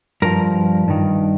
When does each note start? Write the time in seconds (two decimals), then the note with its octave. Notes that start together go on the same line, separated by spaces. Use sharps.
0.22 G2 F3 A#4
0.88 G2 D#3